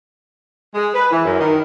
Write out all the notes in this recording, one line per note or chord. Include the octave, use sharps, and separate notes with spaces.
G#3
B4
E3
F#2
D#3